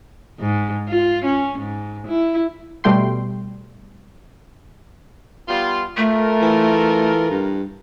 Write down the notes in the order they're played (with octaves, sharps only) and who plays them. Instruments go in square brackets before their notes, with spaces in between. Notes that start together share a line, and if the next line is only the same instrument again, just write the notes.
[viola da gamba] G#2
F4
C#4
G#2
E4
[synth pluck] B2 G3 A3 G5 C6
[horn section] G3 B3 F4
[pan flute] A3 [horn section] F4 A4 A#4
[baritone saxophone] E3
G2